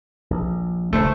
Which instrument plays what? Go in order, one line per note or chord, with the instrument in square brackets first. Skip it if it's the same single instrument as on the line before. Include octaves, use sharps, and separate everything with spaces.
[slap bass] A#1
[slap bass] D#1 C#2 A#2 [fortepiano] A3 C5